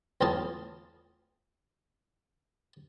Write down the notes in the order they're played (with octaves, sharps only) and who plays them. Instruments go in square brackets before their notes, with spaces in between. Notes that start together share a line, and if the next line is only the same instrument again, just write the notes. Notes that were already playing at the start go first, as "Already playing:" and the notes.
[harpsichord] B1 E2 A2 F4 G#4 A5